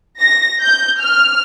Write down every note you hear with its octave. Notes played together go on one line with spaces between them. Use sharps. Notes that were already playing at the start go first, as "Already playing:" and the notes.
A#6
G6
F6